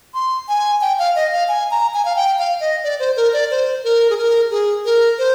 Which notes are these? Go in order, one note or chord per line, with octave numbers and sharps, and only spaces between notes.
C6
G#5
G5
F5
D#5
F5
G#5
A#5
G#5
F5
G5
F5
D#5
D5
C5
A#4
D5
C5
A#4
G#4
A#4
G#4
A#4
C5